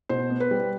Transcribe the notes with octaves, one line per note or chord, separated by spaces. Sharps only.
B2 C5
B3
B4
G3